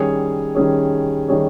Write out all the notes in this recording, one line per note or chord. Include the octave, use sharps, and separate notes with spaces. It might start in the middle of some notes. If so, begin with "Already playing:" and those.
Already playing: D#3 G3 C#4 G#4 C#5
D#3 G3 C#4 G#4 C#5
D#3 G3 C#4 G#4 C#5